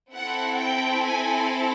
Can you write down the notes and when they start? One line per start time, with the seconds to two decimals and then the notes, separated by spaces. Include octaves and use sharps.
0.14 C4 E4 A4 F#5
0.58 G5
1.02 G#5